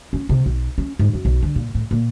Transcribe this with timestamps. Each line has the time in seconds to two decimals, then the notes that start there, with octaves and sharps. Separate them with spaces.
0.13 C#4
0.29 C3
0.46 B1
0.78 C#4
0.99 G#2
1.13 F#2
1.25 B1
1.42 D3
1.56 A#2
1.75 A2
1.91 A#2